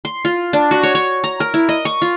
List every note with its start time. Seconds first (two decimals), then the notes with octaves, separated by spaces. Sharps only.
0.05 C6
0.25 F4
0.53 D4
0.71 F#4
0.83 C#5
0.95 C#5
1.24 A#5
1.40 A#4
1.54 E4
1.69 D#5
1.85 C#6
2.02 F4